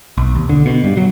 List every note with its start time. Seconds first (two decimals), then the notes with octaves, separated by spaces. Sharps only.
0.17 B1
0.36 D#2
0.49 D3
0.66 B2
0.84 G2
0.97 F#3